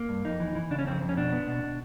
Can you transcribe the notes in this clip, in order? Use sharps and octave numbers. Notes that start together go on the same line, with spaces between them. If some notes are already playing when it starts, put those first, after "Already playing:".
Already playing: A#3
G2
F2 D#4
E3
E3
C#3 D4
C#4
F2 C4
F2
C#4
B2 D4
B3
B2
B2